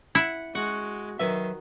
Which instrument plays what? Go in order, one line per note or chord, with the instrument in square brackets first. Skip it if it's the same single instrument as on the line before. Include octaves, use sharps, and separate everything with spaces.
[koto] E4 [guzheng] F#5
[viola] G#3 [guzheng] F#4 F#5
[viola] D#3 [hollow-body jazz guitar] F#3 B4 E5